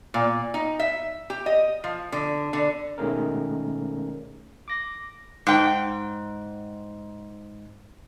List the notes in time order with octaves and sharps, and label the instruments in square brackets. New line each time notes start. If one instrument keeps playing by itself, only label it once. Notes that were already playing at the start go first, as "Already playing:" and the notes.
[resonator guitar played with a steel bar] A#2
D#4
E5
G4
D#5
F3
D3
D3
[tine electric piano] B2 D#3 G#3 A3 C#4 A#4
D6 A#6
[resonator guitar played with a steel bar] G#2 G5